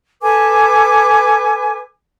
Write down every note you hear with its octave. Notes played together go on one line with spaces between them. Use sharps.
A4 B4 G#5 D6